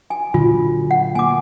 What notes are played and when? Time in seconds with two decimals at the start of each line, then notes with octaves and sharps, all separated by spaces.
0.10 G#5
0.34 A#2 D3 F#3 F4
0.91 F#5
1.15 A#3 G#5 D6